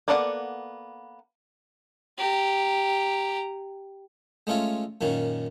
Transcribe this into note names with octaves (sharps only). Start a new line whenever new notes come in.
A#3 B3 A4 D5 F#5
G4 A#5
G#3 A3 C#4 F4 C#5
F#2 A#2 D#3 C#4